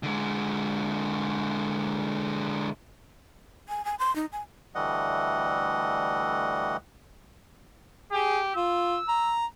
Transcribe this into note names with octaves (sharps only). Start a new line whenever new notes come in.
D3 G#3
G#5
G#5
C6
D#4
G#5
D2 E3 G3 A3 D#5 F#5
G4 G#4
F4 E6
A#5